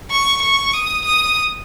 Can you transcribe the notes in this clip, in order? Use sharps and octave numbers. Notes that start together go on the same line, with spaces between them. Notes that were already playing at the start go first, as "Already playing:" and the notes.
C#6
C#6
D#6
D#6